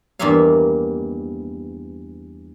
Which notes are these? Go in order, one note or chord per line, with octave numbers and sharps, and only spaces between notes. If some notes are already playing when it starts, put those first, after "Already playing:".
E2 G2 D#3 A#3 E5 F5